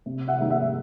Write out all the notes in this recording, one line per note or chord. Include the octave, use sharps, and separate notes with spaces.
C3
E5 F#5
D#3 G3 A#3 D#4
E5 F#5